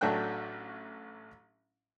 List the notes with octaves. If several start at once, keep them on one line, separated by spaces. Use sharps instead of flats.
A1 F#3 A3 D4 G5 F#6